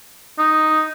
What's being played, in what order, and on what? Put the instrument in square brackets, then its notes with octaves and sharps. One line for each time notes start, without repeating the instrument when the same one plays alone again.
[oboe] D#4